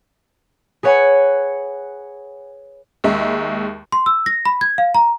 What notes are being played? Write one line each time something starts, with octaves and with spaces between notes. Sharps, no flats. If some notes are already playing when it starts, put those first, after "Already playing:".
G#4 B4 C#5 F#5 G#5 B5
D#2 G#3 E5 A#5
C6
E6
A#6
B5
G#6
F5
A#5